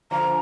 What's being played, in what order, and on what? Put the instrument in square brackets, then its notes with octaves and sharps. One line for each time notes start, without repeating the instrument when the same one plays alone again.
[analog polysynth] D3 F3 [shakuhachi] A#5